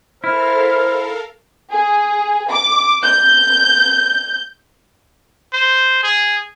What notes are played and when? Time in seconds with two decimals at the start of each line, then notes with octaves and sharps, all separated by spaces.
0.24 E4 A4 A#4 C5 F5 F6
1.72 G#4
2.50 D6
3.03 G6
5.53 C5
6.03 G#4